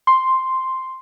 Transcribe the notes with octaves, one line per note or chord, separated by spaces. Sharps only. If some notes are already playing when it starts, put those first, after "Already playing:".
C6